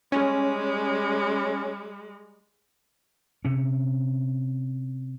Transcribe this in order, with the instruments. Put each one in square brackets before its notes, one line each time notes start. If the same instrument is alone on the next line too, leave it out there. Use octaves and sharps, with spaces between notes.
[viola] G3 G#3 [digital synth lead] C#4
[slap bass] C3 C#4